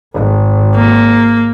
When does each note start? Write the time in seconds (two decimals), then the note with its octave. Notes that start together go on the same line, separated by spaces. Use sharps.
0.14 G#1
0.75 A#3